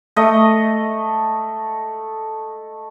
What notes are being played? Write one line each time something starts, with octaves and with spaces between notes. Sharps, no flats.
A3 D#5